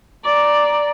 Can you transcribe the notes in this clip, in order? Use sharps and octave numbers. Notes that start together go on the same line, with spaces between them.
D5 A#5